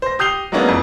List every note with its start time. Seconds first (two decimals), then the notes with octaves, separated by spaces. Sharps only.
0.02 C5 A#6
0.19 G4 D#6 G6 C7 F7 G7
0.52 F#3 G#3 A#3 B3 C#4 D4
0.68 F2 E3